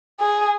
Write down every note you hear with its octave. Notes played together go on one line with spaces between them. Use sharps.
G#4